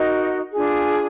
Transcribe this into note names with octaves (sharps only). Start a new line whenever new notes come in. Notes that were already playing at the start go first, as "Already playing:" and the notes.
Already playing: D#4 F#4 A#4 D#5
D4 F4 G#4